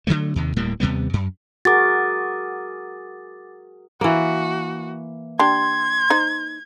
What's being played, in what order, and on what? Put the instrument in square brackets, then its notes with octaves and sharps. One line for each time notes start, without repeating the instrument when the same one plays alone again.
[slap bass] D3 E3 F#3 A3
D#2 C3 D#3
D1 A2 G3 A#3
D#2 C3 G3 B3
F#2
[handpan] F#4 G#4 A#4 [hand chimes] D6 A6
[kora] E3 A#3 [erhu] F#4
[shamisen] D4 G4 [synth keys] C6 [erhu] G#6
[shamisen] D#4 C5